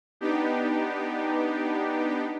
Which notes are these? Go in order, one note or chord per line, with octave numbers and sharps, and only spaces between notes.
B3 D4 D#4 G4